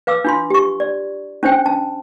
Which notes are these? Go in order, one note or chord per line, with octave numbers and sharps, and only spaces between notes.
B4 F5 D6 E6
D4 F4 C6
G4 C#6
D5
C#4 D4 C5 G5
A5